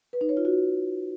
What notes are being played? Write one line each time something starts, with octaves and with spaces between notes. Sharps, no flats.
B4
D#4
C#5
F4
F#4